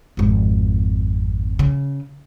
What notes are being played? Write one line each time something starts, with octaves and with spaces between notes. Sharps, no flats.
G#1 F2
C#3